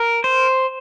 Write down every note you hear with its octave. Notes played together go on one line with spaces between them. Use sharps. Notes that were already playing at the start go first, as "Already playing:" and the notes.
Already playing: A#4
C5